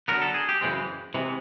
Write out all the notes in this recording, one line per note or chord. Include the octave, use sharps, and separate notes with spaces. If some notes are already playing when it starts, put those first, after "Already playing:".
D3 F#3 B3 A#4
A4
G#4
G4
F#2 C#3 E3 G#3 C4
C3 E3 G#3